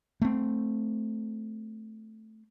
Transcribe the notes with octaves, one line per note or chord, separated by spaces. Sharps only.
A3 C4